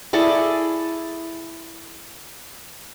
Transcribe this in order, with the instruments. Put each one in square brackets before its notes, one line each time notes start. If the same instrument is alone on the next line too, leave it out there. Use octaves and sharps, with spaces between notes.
[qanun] E4 G#4 A4 D5